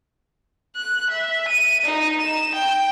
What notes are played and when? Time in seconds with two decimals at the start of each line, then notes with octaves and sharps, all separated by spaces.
0.76 F#6
1.11 E5
1.48 D#7
1.85 D#4
2.21 E7
2.55 G5